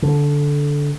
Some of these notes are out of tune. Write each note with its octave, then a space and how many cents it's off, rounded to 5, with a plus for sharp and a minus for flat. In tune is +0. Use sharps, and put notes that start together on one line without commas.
D3 -15